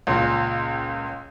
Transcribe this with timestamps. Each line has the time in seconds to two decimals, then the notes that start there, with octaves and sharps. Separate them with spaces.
0.07 C#2 A#2